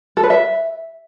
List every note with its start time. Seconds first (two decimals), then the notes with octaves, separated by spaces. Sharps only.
0.17 A4
0.23 B4
0.30 E5